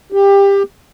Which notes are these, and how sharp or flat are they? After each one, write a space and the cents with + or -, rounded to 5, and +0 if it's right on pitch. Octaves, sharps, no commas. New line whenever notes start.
G4 +20